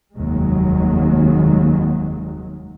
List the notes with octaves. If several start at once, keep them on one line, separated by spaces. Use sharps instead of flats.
F1 D#2 F#3 G#3